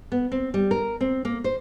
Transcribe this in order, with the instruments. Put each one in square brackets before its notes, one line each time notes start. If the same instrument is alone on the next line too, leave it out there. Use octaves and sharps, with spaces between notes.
[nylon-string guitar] B3
C4
G3
A#4
C4
A#3
C5